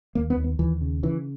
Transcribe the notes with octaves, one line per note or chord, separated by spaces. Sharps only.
D#2 A#3
B3
D#2
B3
D#2 E3
C#3
C#3 E3